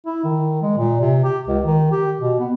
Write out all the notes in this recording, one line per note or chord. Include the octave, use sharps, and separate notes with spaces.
E4
D#3
G#3
A#2
C3
G4
C#2
D#3
G4
B2
B3